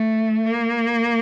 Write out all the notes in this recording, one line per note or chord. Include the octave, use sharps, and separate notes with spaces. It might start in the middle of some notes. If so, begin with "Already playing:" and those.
Already playing: A3
A#3